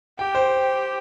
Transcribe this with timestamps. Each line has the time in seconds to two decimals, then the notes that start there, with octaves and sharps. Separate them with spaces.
0.19 G4 G5
0.35 C5